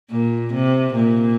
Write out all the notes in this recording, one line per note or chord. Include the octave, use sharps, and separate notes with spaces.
A#2
C3
A#2